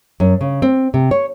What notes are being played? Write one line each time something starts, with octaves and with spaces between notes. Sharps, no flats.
F#2
C#3
C4
C3
C#5